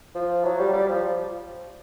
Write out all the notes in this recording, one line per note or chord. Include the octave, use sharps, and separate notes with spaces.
F3
F#3
G3
G3
F3